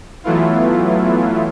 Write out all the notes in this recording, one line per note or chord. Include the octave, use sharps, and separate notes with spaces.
E3 F#3 A3 B3 E4 F4